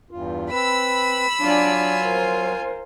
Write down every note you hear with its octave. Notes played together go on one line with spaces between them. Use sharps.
E2 G2 F4
C4 B4 B5 E6
F#3 D4 F4 D5 G#5
A#4 C5